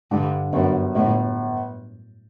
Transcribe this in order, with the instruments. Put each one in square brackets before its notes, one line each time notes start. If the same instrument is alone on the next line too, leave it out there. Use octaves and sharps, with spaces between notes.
[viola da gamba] G2 [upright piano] D3
[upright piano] G1 [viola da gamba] F#2
[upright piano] G1 [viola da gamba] A2